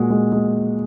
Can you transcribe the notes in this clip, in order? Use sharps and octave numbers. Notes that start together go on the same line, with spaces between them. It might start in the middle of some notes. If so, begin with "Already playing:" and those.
Already playing: A#2 G#3 F#4
G#3
G#3